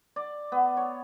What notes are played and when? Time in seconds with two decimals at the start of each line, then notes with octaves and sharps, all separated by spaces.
0.16 D5
0.52 B3
0.77 C#5